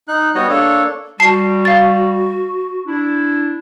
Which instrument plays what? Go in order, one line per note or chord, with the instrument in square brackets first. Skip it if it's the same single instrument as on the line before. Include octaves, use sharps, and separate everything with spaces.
[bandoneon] D#4 F#6
G3 B3 F#4 C#5 D#5
A#3 D4 A4 C#5
[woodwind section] G3 [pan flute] F#4 [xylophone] A5 C7
[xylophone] F5 A6
[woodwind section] D4 E4